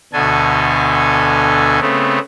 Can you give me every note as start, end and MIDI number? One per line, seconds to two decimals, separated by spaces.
0.13 1.79 38
0.13 1.79 47
0.13 1.79 50
0.13 1.79 69
0.13 1.79 80
1.81 2.19 49
1.81 2.19 57
1.81 2.19 59
1.81 2.19 60